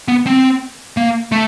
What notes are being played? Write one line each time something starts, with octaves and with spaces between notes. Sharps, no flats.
B3
C4
A#3
A3